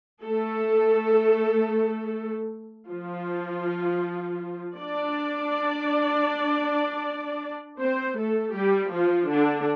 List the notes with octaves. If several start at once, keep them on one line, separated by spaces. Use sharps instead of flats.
A3 A4
F3 F4
D4 D5
C4 C5
A3 A4
G3 G4
F3 F4
D3 D4